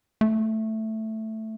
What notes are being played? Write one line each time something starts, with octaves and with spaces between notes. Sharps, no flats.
A3